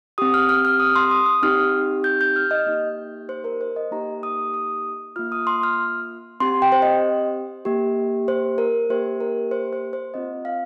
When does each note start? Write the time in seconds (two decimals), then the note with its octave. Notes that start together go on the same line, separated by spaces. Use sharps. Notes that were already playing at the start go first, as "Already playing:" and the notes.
0.18 C4 G4 D#6
0.34 F6
0.49 F6
0.65 F6
0.80 D#6
0.96 C6
1.11 D#6
1.26 D#6
1.42 C4 D#4 G4 F6
2.04 G6
2.21 G6
2.36 F6
2.51 D#5
2.66 A#3 D#4 G4
3.29 C5
3.44 A#4
3.61 C5
3.76 D#5
3.91 A#3 D#4 G4 A#5
4.23 D#6
4.54 D#6
5.16 A#3 F4 F6
5.32 D#6
5.47 C6
5.63 F6
6.40 C4 G4 C6
6.62 G5
6.72 C5
6.82 D#5
7.65 A#3 G4
8.28 C5
8.58 A#4
8.90 A#3 G4 C5
9.20 A#4
9.51 C5
9.73 C5
9.93 C5
10.14 C4 F4 D#5
10.45 F5